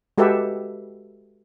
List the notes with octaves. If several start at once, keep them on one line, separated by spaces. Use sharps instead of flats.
G#3 F#4 G4 A4 B4 E5